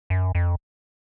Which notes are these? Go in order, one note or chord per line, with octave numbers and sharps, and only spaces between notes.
F#2
F2